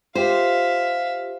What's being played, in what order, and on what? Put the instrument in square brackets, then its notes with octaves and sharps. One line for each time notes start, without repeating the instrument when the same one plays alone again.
[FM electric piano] F4 G4 [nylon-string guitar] C5 [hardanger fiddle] E5 F5